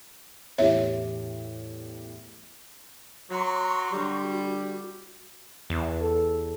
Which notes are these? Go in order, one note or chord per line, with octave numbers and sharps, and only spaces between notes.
E2 A2 G4 C#5 E5
F#3 A#5 C6 C#6
D3 G3
F#4
E2
A4